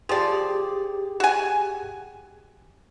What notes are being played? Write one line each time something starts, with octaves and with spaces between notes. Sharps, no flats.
F3 G4 G#4 D5
F#4 G#5